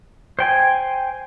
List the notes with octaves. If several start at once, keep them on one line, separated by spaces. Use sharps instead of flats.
C5 G5 G#5